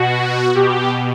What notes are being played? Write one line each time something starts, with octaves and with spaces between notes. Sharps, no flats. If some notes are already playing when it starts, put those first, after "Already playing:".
Already playing: B2 F#4
B2 G4